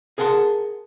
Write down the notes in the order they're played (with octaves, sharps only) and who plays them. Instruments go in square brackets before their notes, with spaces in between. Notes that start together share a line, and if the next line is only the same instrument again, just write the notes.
[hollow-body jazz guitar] G#4 A#4 F#5 A5 C6